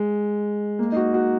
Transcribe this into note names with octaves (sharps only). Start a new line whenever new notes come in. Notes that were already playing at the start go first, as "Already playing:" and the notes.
Already playing: G#3
A#3
D#4
F#4
F#4